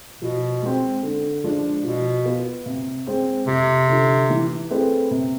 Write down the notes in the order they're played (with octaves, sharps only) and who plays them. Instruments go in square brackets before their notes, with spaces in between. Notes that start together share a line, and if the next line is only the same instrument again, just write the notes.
[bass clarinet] B2 [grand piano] F3
[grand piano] G#3 C4
D3
F3 G#3 D4
[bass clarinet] B2 [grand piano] F3
[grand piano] B3 F4
C3
G#3 C4 G#4 C5
[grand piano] F2 [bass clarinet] C3
[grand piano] D3 F3
E3
A3 C4 G#4 B4
C3